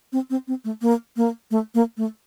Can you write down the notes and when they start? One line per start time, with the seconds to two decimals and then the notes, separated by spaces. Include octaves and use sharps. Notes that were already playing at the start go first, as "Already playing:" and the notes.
0.12 C4
0.30 C4
0.48 C4
0.64 A3
0.82 A#3
1.17 A#3
1.51 A3
1.75 A#3
1.97 A3